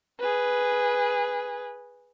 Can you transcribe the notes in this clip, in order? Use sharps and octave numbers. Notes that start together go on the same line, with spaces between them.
G#4 B4